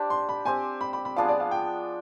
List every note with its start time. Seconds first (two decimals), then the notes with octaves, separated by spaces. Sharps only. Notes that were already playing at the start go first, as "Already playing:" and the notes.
Already playing: D4 G4 C5
0.10 C6
0.29 B5
0.45 C4 G4 C5 G#5
0.81 B5
0.93 B5
1.05 B5
1.16 F3 B3 D4 G#4 F5
1.29 D5
1.40 F5
1.51 G5